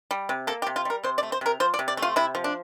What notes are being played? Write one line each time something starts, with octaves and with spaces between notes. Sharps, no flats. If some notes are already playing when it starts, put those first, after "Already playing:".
G3
C3
A#3 A4
G4
C3
F4
G3 A#4
C3 C5
D5
A3
C5
C3 A#4
F3 C5
D5
C3
D5
A3
F4
C3 E4
F3
D4